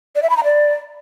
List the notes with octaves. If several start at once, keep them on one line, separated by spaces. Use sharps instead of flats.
D5
E5
B5
A#5
D5